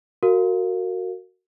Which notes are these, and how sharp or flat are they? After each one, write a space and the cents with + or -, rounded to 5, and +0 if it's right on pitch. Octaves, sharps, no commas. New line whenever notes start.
F#4 +0 A#4 -25 F5 +0